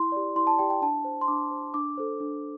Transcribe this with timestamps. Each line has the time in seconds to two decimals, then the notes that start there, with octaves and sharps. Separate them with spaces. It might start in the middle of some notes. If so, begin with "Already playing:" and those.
Already playing: E4 C6
0.12 G4 D5
0.36 E4 C6
0.47 A5
0.58 G4 D5 G5
0.70 G5
0.82 D4 A5
1.04 C5
1.21 C6
1.28 D4 D6
1.51 C5
1.74 D4 D6
1.97 A4 C5
2.20 D4